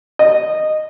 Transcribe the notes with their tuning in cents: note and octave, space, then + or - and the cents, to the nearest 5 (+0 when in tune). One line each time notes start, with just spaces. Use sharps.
D#5 -10